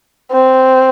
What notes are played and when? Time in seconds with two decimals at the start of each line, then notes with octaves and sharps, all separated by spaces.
0.32 C4